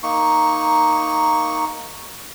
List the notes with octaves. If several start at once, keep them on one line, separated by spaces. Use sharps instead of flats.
A#3 D#4 C#6